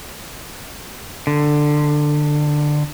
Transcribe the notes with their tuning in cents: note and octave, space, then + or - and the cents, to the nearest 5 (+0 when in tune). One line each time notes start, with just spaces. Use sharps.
D3 +15